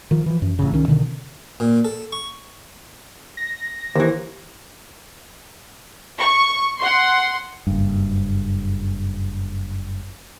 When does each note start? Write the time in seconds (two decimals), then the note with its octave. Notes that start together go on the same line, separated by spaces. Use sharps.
0.11 D#3 F3
0.26 E3 F3
0.42 F#2
0.59 A1 C#3
0.72 C2 D#3 C#4
0.88 B2 D3 D#3
1.60 A#2
1.85 A4
2.12 C#6
3.37 A#6
3.96 D#2 E3 G4 A#4 C5
6.18 C#6
6.79 F#5 C6
7.67 F#1 G2